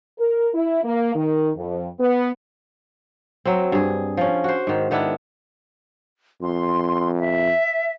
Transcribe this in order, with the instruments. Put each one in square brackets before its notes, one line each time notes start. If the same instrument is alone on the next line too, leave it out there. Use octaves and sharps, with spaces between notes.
[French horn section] A#4
E4
A#3
D#3
F2
B3
[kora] F#3 C4
G2 G#4
F3 C#4
F#4 C5
G#2 D#3
D#3 B3 D4 E4
[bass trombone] F2 [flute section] C6
[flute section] E5